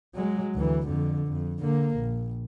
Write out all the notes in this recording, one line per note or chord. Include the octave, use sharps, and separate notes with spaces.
F#3 G#3
D2 E3
F2 D3
F2
D3 A#3
A#1